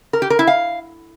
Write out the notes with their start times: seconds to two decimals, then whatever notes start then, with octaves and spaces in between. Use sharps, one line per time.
0.13 A#4
0.22 G4
0.30 A#4
0.39 E4
0.47 F5